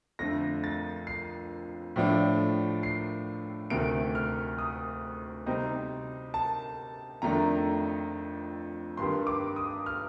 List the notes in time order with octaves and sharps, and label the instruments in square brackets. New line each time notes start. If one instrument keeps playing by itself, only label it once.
[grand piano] F2 D3 F3 A3 A#6
A6
C7
A2 F3 A3 D4
C7
D2 C3 D#3 A3 D7
F6
D#6
C3 G3 C4 D#4
A5
F2 D#3 A3 D4 A#5
G2 D#3 G3 C6
D6
D#6
F6